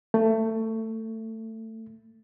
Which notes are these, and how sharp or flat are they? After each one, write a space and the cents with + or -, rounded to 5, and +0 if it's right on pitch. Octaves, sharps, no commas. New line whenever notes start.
A3 +20